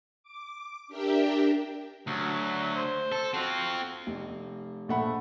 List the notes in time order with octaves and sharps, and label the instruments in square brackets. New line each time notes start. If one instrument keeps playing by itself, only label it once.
[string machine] D6
D4 G4 A#4 E5 G5
[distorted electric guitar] D2 [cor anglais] F#3
[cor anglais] C5
[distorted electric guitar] A4
[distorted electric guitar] C4 F4 [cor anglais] F#4
[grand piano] F1
A#1 A3 F#5 B5